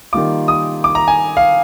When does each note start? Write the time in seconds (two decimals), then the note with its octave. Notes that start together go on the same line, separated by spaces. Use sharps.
0.13 D#3 G3 A#3 F4 D6
0.48 D#6
0.84 D6
0.95 A#5
1.08 G#5
1.37 F5